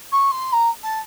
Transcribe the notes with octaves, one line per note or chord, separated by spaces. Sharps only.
C#6
C6
A#5
A5